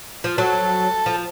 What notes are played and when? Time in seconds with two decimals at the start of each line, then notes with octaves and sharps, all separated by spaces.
0.24 F3
0.38 F#3 A4
1.06 F3